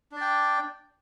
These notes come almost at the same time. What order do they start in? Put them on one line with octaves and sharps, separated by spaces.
D4 D5 G5